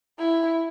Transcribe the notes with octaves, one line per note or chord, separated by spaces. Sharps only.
E4